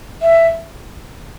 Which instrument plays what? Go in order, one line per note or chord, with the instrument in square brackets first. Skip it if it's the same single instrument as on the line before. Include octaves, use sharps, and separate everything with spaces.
[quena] E5